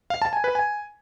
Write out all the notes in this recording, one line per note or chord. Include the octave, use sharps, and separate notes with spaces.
F5
A5
G#5
B4
G#5